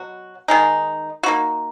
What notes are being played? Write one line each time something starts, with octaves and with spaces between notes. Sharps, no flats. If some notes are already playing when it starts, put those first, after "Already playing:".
Already playing: B2 F#3 F#4
D#3 G#3 D#4
A#3 D#4 F#4